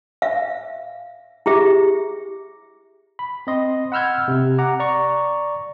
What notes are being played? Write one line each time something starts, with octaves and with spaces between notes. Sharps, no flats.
E5 F5
E4 G4 G#4 E5
B5
C4 D#5 C6
F#5 B5 E6 F6 G6 G#6
C3
F#5 A#5 D6
D5 A#5 C#6